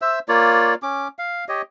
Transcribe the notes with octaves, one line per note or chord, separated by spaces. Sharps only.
C5 E5 E6
A#3 F4 C#5 D5
C#4 D6
F5
G4 C#5 D#5